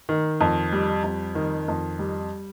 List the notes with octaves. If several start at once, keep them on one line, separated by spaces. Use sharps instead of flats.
D#3
F2
G3
F2
D#3
F2
G3